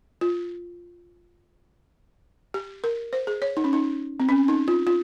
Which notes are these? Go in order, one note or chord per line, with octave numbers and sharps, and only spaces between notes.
F4
G4
A#4
C5
G#4
C#5
D#4
C#4
D#4
C4
C#4
D#4
F4
F4